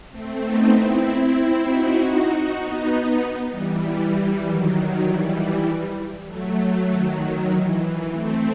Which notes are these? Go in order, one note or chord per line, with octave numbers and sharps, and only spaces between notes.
A3 C4
B3 D#4
C4 E4
D#4 F#4
B3 D#4
E3 G3
D#3 F#3
E3 G3
F#3 A3
F#3 A3
D#3 F#3
E3
E3
A3 C4